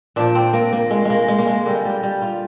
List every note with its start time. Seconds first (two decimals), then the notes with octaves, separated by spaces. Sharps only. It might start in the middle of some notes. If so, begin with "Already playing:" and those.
0.16 A#2 F3 D4
0.35 C4
0.53 A#3
0.73 A#3
0.91 G#3
1.05 G#3 A#3
1.28 G#3
1.39 A#3
1.47 G#3
1.66 D3 G3 A#3
1.85 G3
2.03 G3
2.22 F4